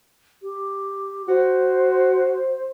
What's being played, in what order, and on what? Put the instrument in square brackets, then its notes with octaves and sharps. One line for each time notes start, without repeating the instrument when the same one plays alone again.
[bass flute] G4
[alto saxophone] F#4 [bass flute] C5